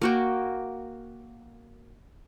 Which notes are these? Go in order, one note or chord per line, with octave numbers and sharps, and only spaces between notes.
A#3 F#4 G5